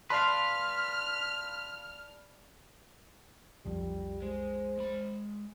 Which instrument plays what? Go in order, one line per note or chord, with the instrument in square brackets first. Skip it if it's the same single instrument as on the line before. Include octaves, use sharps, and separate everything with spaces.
[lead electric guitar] B4 F5 [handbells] D5 A5 B5 [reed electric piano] C6 [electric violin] F6
[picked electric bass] B1 F2 F3 [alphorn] G3
[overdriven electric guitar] G#3 [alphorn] C5
[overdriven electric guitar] G#3 B5